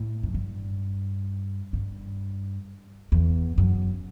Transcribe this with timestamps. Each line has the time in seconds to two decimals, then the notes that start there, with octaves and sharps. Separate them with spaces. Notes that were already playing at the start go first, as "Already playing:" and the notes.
Already playing: A2
0.23 F#2
0.34 G2
1.73 G2
3.12 E2
3.58 F#2